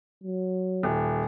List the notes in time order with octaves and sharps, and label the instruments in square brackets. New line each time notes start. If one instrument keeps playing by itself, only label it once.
[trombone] F#3
[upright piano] D#1